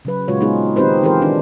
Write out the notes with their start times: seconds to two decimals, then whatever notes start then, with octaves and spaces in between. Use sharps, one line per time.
0.05 C#3 F#3 B4
0.28 A#2 C#3 G#3 F4 F#4 C#5
0.40 G#3 B3 C4 D#4 F4 G#4
0.76 D#3 C4 D#4 G4 B4 C5
1.03 E3 F4 G4 G#4 A#4 C5
1.21 D#3 C4 D4 D#4